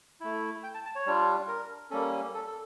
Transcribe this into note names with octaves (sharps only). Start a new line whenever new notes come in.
A3 E4
G5
A5
A5
C#5
G3 D4 F4
A#4
G3 A#3 C#4 A4
A4
A4